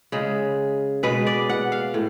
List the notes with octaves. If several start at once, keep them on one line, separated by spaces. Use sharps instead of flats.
C#3 G#3
B2 G#3 B4
D5
F#5
F5
A2